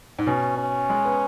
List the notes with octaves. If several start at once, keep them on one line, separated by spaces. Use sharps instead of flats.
G#2
B2 C#4
C#4
G#3
B3